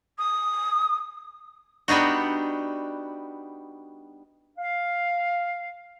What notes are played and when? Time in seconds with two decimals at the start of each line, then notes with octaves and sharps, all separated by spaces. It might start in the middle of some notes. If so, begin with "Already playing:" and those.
0.18 D#6
1.88 G3 B3 D4 D#4 F#4
4.58 F5